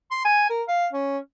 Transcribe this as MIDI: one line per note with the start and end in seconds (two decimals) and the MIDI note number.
0.11 0.22 84
0.25 0.46 80
0.49 0.62 70
0.68 0.87 77
0.92 1.18 61